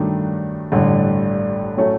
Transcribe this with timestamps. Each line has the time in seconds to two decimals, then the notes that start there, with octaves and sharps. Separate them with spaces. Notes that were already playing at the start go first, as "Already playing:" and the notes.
Already playing: G2 D#3 F#3 A3 D4
0.72 A1 G2 D3
1.77 A2 F#3 A3 C#4